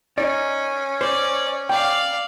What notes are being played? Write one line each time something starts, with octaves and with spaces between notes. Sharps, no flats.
C#4 D#4 D5
C5 D5
D5 F5 G5